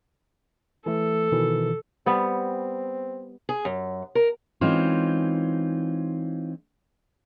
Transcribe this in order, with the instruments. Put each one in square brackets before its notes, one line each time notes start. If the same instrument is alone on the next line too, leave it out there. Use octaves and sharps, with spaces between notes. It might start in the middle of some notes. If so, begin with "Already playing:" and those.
[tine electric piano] E3 A3 [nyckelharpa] A4
[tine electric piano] B2 D#3 E3
[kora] G3 B3 [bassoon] C4
[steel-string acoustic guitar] G#4
F#2
A#4
E3 G#3 C4 C#4 D#4 F4